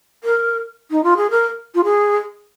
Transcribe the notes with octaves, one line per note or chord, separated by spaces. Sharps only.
A#4
D#4
F4
G#4
A#4
F4
G#4